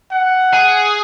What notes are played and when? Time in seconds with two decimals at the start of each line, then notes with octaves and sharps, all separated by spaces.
0.11 F#5
0.54 G#4